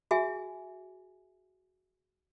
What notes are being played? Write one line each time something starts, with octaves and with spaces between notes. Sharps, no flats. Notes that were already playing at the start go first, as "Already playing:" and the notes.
F#4 G#4 E5 G#5